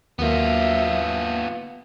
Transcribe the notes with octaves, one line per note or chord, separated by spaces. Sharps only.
D#2 F#3 A#3 B3 F4 E5